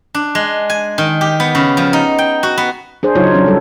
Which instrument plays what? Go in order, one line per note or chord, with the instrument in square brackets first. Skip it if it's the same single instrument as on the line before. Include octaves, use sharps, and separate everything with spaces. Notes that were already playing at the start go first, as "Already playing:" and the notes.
[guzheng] D4
G#3
G#5
D#3
G4
B3
C#3
F3
D#4
G5
F#4
B3
[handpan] D4 G#4 C5
C#3 F#3 D#4 F4 C#5
F#3 C#4 D4
G3 A4